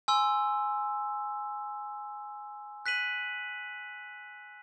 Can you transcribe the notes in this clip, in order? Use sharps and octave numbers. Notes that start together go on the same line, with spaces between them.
G#5 C6 E6
F#6 B6 D#7 F#7